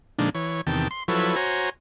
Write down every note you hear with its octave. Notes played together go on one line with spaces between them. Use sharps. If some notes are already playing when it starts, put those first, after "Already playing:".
A#2 D3 F3 G#3 D4 D#4
E3 C#5
E2 C3 D#3 G5 A5
C6
F3 F#3 E4 A4 B4 C#5
F#4 C5 C#5 G#5 A#5